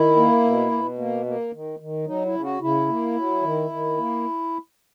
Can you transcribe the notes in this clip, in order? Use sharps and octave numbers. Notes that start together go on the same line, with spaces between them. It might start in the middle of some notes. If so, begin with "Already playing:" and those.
Already playing: D#3 E4
A#3
B2
B2
A#3
A#3
D#3
D#3
F#3 D#4
E4
C#3
F#4
C#3 E4
A#3
F#3
D#3
D#3
A#3